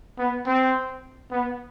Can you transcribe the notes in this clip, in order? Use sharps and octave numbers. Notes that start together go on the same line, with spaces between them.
B3
C4
B3